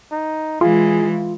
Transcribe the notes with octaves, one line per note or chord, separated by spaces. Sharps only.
D#4
E3 G#3 F4 G#4